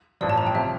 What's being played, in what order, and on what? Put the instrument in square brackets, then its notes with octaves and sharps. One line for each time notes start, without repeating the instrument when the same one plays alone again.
[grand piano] A1 G2 F3 [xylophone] D5
[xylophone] A5
A#5
G5
[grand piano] C3 F3 [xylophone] E5